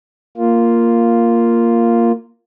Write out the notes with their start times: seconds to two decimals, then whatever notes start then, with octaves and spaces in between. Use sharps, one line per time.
0.37 A#3 F4